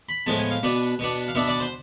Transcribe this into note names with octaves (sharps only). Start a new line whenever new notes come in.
B5
A2 F3 G#3 B3 A5
G#5
F5
B2 B3 D4
B2 B3 D4
F5
B2 B3 D4 E5
D5
C5